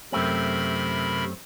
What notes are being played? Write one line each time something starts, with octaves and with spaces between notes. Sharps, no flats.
F#2 C3 A3 C4 A#4 B5